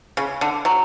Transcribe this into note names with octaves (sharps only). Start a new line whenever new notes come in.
C#3
D3
F#3